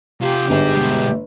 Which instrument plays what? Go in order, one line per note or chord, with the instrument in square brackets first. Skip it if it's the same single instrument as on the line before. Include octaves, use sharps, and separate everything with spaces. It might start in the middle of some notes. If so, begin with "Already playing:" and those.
[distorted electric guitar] C3 F4 [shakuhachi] G4
[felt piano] G1 [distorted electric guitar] D#4 G#4
[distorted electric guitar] B2 G#3